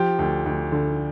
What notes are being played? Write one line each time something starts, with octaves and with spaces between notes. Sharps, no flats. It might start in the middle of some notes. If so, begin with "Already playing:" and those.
Already playing: F3 G4
D2
D2
D3